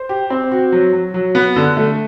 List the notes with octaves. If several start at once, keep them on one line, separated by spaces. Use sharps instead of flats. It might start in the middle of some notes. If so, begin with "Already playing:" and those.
Already playing: C5
G4
C4
F#4
F#3
F#3
F#3
B3
D3
A3